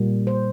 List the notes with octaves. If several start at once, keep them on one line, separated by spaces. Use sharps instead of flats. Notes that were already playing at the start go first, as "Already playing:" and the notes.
Already playing: A#2 G3 A#3
C5